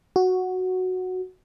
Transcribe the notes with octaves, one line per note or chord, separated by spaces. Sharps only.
F#4